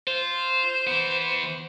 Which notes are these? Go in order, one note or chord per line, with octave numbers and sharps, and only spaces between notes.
F4 C5
E3 B3